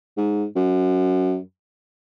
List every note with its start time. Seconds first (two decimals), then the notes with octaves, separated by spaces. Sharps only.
0.18 G#2
0.56 F#2